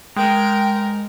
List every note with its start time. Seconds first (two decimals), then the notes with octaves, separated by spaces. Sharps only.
0.16 G#3 A#4 G5